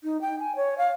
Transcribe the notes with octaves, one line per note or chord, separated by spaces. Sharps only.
D#4
G5
G#5
C#5
F5